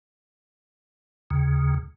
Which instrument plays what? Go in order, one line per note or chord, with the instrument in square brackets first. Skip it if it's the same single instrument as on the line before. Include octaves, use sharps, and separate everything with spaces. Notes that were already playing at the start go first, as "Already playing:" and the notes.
[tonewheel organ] D#2 C#3